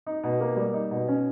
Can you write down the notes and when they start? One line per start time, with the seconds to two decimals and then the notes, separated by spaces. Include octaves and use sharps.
0.06 D#4
0.24 B2
0.41 A#3
0.56 G3
0.74 D#4
0.91 B2
1.08 C#4